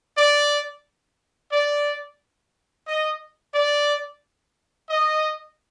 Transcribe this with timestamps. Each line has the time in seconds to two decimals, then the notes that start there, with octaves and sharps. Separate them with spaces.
0.17 D5
1.52 D5
2.87 D#5
3.54 D5
4.89 D#5